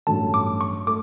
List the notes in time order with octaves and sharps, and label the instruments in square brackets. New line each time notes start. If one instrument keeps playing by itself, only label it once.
[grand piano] A1 G2 F#3 A3 [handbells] A5
[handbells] D6
C#6
[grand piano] A3 [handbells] D6